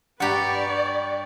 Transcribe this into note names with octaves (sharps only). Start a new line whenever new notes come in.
G2 G4 B4 D5 F#5 A#5 B5 C#6